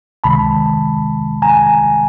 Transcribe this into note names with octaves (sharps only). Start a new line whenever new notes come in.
C#2 C3 D#3 G#3 A5 B5
G#5 A#5